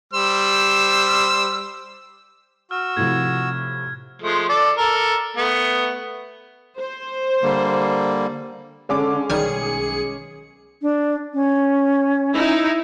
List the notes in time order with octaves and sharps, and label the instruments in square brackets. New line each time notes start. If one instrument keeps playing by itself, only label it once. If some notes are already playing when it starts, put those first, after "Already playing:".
[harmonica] G3 C5 E6
[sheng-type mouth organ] F#4 E6 [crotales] F6
[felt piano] A2 C3 F3 [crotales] G#6
[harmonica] F3 G#3 A3
A4 D5
A4 A#4
A3 B3
[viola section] C5
[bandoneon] D3 G3 A#3
[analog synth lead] D3 [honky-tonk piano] G#3 C#4 D6
[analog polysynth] B1 G#4 [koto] D#3 G3 G#5 [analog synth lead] C#7
[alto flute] D4
C#4
[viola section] D#4 E4